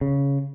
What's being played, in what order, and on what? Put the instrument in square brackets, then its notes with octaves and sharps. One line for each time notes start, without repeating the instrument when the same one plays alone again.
[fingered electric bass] C#3